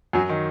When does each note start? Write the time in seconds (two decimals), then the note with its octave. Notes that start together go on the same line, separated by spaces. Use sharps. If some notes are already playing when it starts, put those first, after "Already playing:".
0.13 F#2 F#3
0.29 D#3